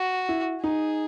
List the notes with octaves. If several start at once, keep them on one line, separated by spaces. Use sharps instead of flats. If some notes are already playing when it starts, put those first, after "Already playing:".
Already playing: F#4
E4
D#4 G#4